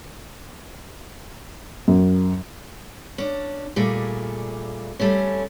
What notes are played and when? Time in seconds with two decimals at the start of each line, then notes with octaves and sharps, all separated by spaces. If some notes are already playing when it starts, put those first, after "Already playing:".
1.88 F#2
3.18 C#4 D4
3.76 A#2 G3 A3 G#4
5.00 G3 A3 C4 C#4